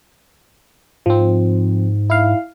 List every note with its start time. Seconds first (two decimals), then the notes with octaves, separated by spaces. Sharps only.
1.06 G#2 F3 C4
2.10 E4 F5